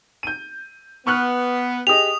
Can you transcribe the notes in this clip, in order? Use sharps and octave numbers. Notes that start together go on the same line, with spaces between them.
G6 D#7
B3 C#6 F6 F#6
G4 G#4 D#5 D#6 F7